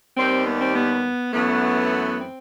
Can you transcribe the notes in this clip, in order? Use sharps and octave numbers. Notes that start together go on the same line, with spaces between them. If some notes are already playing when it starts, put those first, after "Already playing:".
D#2 D#3 G3 C4
B3
C4
B3
F#2 E3 A3 B3
C4